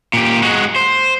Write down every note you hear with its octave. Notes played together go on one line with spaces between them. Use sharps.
A#2 G4
G#3 F#4
C5